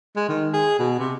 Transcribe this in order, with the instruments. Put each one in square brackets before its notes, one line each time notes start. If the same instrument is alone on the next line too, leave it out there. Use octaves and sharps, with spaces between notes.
[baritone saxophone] G#3
D#3
G#4
B2
C3